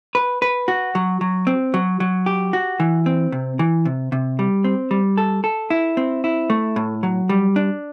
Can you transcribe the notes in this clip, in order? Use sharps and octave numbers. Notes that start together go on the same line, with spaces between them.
B4
B4
F#4
F#3
F#3
C4
F#3
F#3
G4
F#4
E3
C4
C3
E3
C3
C3
G3
C4
G3
A4
A4
E4
C4
E4
A3
A2
F#3
G3
D4